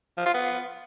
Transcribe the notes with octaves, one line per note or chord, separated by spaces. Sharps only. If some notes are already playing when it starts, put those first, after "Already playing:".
F3
F4
B3